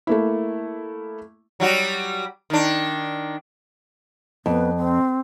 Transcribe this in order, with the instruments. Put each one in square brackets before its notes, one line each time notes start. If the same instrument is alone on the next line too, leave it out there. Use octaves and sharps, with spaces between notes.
[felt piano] A3 A#3 E4
[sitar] F#3 G3 F#4
D#3 D4
[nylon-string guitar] F2 [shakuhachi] B3
[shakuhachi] C4